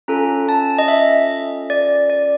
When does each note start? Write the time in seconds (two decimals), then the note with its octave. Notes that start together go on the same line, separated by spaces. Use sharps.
0.08 C#4 F4 A4 A#5
0.49 A5
0.78 D#5
0.88 E5
1.70 D5
2.10 D5